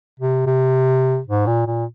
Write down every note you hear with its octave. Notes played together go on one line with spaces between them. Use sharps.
C3
C3
G#2
A#2
A#2